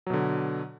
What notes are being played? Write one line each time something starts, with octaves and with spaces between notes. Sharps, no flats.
B2 D3 F#3